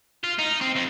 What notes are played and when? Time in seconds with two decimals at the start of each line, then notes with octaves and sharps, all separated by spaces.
0.24 F4
0.39 D#4
0.61 C4
0.76 F2